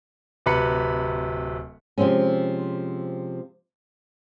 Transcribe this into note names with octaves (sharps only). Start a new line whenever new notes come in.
D1 C3 B4 B5 C#7
C3 F3 G#3 C4 C#4